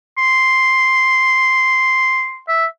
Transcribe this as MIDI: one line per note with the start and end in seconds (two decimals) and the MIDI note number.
0.18 2.41 84
2.48 2.66 76